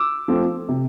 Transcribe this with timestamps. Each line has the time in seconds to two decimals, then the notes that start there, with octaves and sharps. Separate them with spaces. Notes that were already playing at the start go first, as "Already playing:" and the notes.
Already playing: D6 E6
0.28 F3 A3 C4
0.69 C3